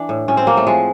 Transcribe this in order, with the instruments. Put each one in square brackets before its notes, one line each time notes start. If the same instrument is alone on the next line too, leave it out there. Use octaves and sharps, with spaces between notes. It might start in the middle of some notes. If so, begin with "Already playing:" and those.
Already playing: [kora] E3 D4
A2
A2 C#4
C4
F#3 A#3
A3
F3 G#3